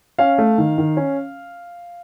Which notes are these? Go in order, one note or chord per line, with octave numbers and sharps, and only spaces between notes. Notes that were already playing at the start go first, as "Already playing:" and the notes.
C#4 F5
A3
D#3
D#3
C#4